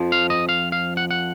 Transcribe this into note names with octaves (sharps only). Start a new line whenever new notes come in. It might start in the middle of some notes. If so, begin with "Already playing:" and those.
Already playing: F2 F3
F5
D#5
F5
F5
F#5
F#5